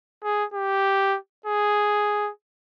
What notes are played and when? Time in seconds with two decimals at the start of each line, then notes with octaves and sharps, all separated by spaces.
0.24 G#4
0.54 G4
1.46 G#4